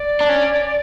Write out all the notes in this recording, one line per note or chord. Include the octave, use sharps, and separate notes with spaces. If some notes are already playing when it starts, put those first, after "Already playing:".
Already playing: D5
D4
C#4